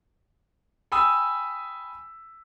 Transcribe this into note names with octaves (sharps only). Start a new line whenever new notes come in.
G5 G#5 B5 D#6 E6